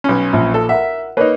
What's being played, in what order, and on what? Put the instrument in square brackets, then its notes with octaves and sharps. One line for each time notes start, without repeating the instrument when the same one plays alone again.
[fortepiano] B1 C#4
[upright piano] A#1
[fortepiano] A4
[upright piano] A#4 F#5 [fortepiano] E5
[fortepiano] A#3 D#4 [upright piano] B4 C#5